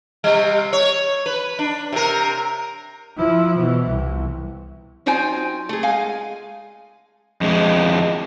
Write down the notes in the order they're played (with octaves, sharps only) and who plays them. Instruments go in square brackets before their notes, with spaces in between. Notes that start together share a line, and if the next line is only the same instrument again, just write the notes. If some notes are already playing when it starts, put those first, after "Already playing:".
[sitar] C3 G3
C#5
B4
D4
C3 A#4
[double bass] F3 E4
B2 E3
C2
[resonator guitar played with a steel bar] F#3 D#4 F4 C5 G5 G#5
A3 G#4
G#3 F5 G#5
[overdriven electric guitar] F2 G#3